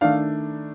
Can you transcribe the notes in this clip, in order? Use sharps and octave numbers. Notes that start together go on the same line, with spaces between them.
D#3 A3 D4 F5